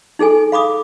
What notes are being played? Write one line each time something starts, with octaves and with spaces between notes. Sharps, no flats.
D#4 G#4 A4 G#5
F5 B5 D6 D#6